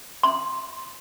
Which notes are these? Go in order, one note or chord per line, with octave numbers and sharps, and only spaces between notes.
C6